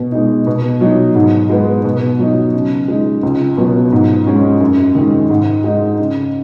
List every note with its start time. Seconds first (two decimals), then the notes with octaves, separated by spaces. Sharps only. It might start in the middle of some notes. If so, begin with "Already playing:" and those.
Already playing: B2
0.12 G#3 D#4
0.47 B2
0.81 F#3 D#4
1.15 G#2
1.49 G#3 B3
1.84 B2
2.19 F#3 D#4
2.53 C#3
2.88 G#3 D#4
3.23 C#2
3.57 B2 F#3 B3
3.92 G#2
4.27 G#3 C#4
4.61 F#2
4.95 D#3 G#3
5.30 G#2
5.64 G#3 D#4
5.99 C#3